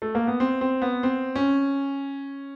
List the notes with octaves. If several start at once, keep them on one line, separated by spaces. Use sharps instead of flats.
A3
A#3
B3
C4
C4
B3
C4
C#4